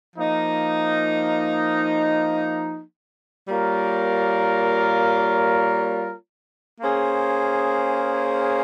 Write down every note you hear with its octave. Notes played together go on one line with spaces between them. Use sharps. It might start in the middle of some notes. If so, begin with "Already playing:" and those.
F3 A#3 D#4
G3 A#3 F4 A#4 C#5
A#3 C#4 G#4 C5